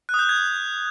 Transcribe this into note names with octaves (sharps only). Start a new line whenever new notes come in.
F#6
D#6
G6
D#6
G#6